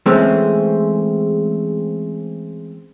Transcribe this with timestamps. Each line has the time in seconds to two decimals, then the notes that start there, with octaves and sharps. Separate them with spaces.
0.06 E3 G#3 A3 C4 C#4